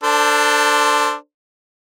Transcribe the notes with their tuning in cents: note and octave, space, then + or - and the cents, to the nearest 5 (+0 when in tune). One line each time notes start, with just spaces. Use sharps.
D4 +0 A4 +30 C5 +0